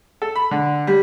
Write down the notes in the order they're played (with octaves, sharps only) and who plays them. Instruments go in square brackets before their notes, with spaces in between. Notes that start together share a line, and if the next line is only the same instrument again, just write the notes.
[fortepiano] A4
B5
D3
G3